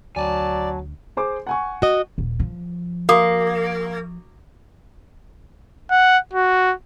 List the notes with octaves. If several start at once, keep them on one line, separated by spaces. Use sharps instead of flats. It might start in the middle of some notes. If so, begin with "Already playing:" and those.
D2 F#3 D5 G#5 A5
G#4 C5 D6
F#5 G#5 C#6
F#4 D#5
D#1
F3
A#3 F#4 D6 D#6
F#5
F#4